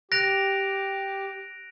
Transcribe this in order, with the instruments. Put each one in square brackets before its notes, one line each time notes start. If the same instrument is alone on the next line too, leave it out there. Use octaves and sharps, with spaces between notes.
[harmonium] G4 [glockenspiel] F#6 A#6 D7 F7